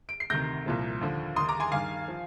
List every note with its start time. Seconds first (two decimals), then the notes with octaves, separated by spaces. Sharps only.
0.09 D7
0.20 C7
0.30 D2 C3 D#3 G6 A#6
0.66 C2 A#2 F3
1.01 D#2 D3 F3
1.36 D#2 C6 D#6
1.40 D#3
1.49 A#5 D6
1.60 G#5 C6
1.72 G2 D#3 F5 G#5
2.08 F3